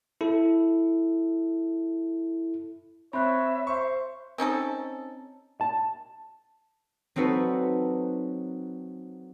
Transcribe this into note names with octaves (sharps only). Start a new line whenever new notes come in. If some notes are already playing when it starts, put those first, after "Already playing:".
E4 A4
C4 C#5 E5 B5 F#6
C5 C#6
C4 C#4 D#4 A4
A5
F#3 C4 D#4 F#4 A4 B4